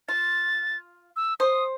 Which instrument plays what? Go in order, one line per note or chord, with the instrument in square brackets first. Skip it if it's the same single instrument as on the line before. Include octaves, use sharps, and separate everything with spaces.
[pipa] F4 [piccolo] A6
[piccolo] E6
[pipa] C5 [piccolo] D#6